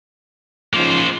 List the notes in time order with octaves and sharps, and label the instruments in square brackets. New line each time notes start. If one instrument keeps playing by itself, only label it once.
[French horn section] G#2 C#3 F3 [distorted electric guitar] A#3 C5